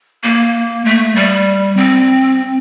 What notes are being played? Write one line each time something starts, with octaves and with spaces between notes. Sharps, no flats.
A#3
A3
G3
C4